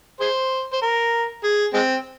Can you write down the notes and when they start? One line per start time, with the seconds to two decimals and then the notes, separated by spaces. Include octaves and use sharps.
0.20 G#4 C5
0.73 C5
0.82 A#4
1.43 G#4
1.74 G#3 C4